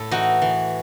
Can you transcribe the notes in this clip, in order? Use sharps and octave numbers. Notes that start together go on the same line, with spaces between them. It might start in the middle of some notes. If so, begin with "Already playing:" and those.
Already playing: A2 A4
E3 D#4 F#4
E3